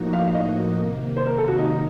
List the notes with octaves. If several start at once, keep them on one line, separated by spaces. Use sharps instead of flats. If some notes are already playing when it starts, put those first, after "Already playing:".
Already playing: A2 F3 A#3 D#4 F#4
F5
F5
D#5
C3 D#3 A#3
C5
A#4
A4
F#4
D#4
D#4